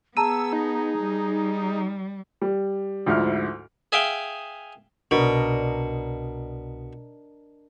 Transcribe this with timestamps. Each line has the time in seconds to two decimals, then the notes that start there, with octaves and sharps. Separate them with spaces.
0.17 B3 G#4 A5 A#5 E6 D#7
0.53 D#4
0.98 G3
2.42 G3
3.06 D2 G#2 F3 E4 F6
3.92 G#4 E5 F5 G5
5.11 C2 B2 D4 A#4 D#5